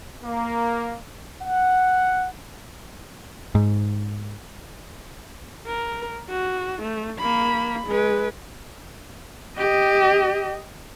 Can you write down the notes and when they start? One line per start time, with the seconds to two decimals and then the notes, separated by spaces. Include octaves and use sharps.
0.24 A#3
1.42 F#5
3.55 G#2
5.67 A#4
6.30 F#4
6.82 A3
7.19 A#3 B5
7.87 G#3 B4
9.58 G4 D#5